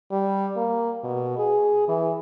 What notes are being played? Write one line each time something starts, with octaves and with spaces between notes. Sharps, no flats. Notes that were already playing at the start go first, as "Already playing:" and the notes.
G3
A#3
B2
G#4
E3